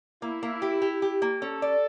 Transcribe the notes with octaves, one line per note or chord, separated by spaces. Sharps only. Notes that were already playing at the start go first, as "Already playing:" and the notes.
A#3 E4
A#3
G4
G4
G4
A#3
C#4 A4
D5